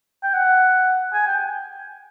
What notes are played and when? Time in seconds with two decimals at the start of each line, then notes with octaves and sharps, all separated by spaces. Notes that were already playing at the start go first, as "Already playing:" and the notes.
0.23 G5
0.33 F#5
1.13 G#5
1.27 G5